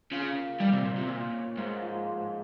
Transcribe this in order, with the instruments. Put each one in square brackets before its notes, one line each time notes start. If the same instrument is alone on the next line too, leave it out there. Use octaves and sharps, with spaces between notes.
[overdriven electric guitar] C#3 [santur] F4
[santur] A#3
[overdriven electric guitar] G3 [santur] D#4
[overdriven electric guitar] C3
[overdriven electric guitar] A#2 [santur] C5
[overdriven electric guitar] C3
[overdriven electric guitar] A#2 [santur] C5
[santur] C#4
[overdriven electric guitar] G#2 [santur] A#3
[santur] F3
F3